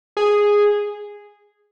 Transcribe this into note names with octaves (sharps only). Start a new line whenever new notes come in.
G#4